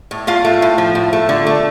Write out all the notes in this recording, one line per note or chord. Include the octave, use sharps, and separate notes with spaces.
A2
A2 F4 F5
A3
A2
F3
A2
A3
D3
A3